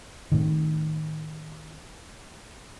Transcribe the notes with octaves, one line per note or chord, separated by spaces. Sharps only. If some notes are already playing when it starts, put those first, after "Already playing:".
A2 D#3